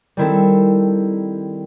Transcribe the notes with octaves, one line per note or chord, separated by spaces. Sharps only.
D#3 G3 C4 E4 A4